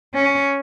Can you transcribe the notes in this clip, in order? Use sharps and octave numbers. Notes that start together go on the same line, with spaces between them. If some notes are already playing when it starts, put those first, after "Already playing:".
C#4